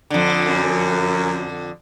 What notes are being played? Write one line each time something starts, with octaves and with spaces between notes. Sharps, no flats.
F2 D3
F#2